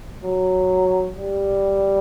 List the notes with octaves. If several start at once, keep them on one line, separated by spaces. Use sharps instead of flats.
F#3
G3